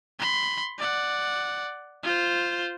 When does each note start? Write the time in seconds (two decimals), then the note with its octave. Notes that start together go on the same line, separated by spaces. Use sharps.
0.19 B5 C6
0.78 D5 F#5
2.03 F4 C5